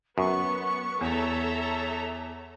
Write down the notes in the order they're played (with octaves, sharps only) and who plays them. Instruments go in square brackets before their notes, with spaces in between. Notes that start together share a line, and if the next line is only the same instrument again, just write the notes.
[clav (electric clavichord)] F#2 [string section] B3 [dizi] C#6
[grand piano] E2 [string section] A4 E5 A#5 [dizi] C#5